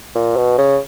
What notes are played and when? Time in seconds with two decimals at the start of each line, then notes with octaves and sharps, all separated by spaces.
0.15 A#2
0.37 B2
0.58 C#3